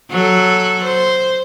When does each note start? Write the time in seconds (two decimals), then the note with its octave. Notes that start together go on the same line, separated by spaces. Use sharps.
0.11 F#3 A4
0.84 C5